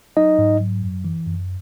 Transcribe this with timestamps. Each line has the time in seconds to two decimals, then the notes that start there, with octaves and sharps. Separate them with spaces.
0.16 F#3 D#4 D#5
0.38 G#2
0.60 F#3
0.82 F#2
1.05 E3
1.26 F#2